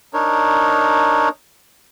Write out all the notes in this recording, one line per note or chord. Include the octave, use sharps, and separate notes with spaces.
D4 D#4 A#4 C#5